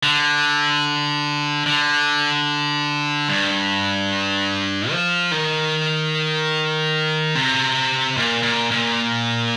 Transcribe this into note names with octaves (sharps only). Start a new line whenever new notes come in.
D3
D3
G2
F3
D#3
C3
A#2
A#2
A#2